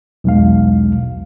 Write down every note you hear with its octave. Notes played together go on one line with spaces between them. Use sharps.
B1 E2 G#3 F5